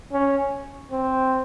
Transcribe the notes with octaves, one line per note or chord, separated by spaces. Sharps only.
C#4
C4